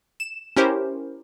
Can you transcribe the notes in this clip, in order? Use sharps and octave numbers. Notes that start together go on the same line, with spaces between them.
E7
C#4 E4 G4 A#4 C5